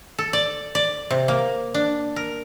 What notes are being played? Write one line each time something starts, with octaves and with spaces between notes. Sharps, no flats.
A4
D5
D5
C3
A#3
D4
A#4